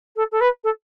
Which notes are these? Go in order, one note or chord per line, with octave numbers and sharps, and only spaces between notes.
A4
A4
B4
A4